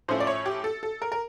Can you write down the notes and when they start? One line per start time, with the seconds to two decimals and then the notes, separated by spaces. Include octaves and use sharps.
0.08 A2 F3 A3 C#4 E4 C5
0.20 D5
0.27 C#5
0.46 G4
0.64 A4
0.83 A4
1.02 A#4
1.12 A#4